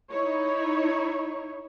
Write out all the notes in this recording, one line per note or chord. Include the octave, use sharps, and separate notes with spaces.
D#4 E4 C#5